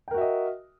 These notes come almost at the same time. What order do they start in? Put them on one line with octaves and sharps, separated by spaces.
G5 A#4 F#4 E5 D#5